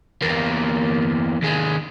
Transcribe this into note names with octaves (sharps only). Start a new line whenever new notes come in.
E2 A#3
D#2 G#3